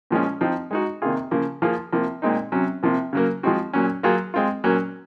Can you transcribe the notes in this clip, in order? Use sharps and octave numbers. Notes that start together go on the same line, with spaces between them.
A#2 F3 G#3 C#4
F3 C4 D#4
G#3 D#4 F#4
C3 D#3 A#3 F4 G#4
C#3 F3 A#3
F3 A#3 F4 G#4
C3 F3 A#3
A#2 G#3 C4 D#4
C3 F#3 C#4
C3 F3 A#3
C#3 F#3 A#3
F3 G#3 C4 F#4
A#2 F#3 C#4
F#3 A#3 F4 G#4
G#3 C4 F4
A#2 F#3 A#3 C#4